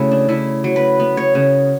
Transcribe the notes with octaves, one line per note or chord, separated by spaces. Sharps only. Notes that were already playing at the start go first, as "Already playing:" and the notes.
Already playing: C#3 A3 E4 F#4
D4
C#3 E4
F#3
B4
B3
C#5
C#3